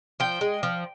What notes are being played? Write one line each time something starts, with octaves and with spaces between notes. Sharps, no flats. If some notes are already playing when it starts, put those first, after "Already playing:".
F3 G5
G#3
F3